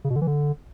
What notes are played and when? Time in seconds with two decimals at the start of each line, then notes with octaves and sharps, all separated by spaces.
0.04 C#3
0.10 B2
0.16 D3
0.21 E3
0.27 D3